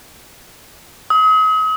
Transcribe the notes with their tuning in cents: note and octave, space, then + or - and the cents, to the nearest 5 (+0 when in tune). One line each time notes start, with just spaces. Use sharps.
D#6 +40